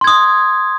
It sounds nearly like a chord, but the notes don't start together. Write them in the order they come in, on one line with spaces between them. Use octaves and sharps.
C6 G#6 D#6